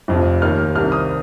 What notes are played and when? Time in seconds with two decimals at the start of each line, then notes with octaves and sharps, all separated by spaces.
0.08 F1 F2 F3
0.41 D#2 D#3 F6
0.75 C2 C3 D#3 F6
0.92 D#6